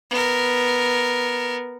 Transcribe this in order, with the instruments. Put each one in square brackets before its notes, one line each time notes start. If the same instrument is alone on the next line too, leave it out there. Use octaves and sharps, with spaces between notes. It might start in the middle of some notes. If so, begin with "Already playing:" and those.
[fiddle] B3 A#4